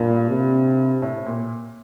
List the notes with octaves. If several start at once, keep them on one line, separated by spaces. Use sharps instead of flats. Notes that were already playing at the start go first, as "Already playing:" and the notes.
Already playing: G2 A#2
C3
A2
A#2